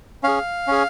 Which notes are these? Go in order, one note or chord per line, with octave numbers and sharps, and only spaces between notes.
C#4 G#4 F5
C#4 G#4